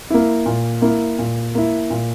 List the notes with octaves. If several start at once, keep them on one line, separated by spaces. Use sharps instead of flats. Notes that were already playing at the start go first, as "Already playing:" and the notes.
A#3 E4
A#2
A#3 E4
A#2
A#3 E4
A#2